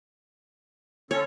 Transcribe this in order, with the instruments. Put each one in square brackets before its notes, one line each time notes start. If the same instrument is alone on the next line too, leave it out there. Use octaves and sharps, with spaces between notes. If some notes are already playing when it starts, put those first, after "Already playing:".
[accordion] D3 C#4 A4 [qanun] C#5